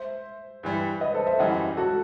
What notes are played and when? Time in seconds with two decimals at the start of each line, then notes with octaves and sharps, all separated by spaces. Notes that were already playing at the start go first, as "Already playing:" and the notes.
Already playing: C5 E5
0.63 G2 E3 G3
1.01 B4 D#5
1.14 A4 C5
1.26 C5 E5
1.39 F#2 E3 G3 D#5 F#5
1.77 F#4 A4